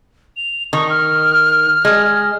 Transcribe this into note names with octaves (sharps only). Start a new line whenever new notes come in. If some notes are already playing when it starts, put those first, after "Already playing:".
F7
D#3 C#6
F6
G#3